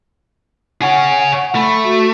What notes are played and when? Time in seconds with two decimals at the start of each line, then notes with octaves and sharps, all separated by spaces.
0.82 G#4 C#5 F#5
1.18 F#5
1.55 A3 B5
1.84 F#4